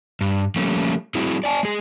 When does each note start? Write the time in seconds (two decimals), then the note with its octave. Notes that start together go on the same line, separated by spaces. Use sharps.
0.21 G2
0.56 F3 G3 A3 A#3 C#4
1.15 G3 A3 C4 E4 F#4 G#4
1.44 D5 G#5 A5
1.63 G#3 G#4